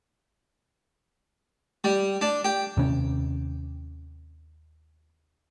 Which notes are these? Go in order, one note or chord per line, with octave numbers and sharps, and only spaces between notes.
G3
D4
G4
D#2 C3 C#4